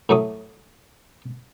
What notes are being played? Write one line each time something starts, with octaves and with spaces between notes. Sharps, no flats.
A2 F#3 A3 D6 D#6